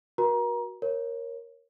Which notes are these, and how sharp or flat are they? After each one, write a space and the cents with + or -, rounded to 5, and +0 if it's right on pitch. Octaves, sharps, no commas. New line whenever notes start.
F#4 +0 A#4 +40 A#5 +25
A#4 +10 C#5 -15